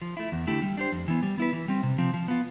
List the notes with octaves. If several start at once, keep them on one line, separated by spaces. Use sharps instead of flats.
F3
A3 E4
E2
D3 A3 E4 G4
G3
D4 G4 C5
F2
E3 B3
G3
B3 E4 B4
E3
G3 C4
C3
F3 C4
F3
B3 F4